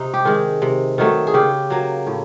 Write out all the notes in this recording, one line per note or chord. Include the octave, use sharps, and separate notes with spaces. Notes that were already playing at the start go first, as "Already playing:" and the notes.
Already playing: C3 D#4
G4
D#3 G#3
C3
D#3 F#3 A3
G#4
C#3 G4
F#3 A#3
A2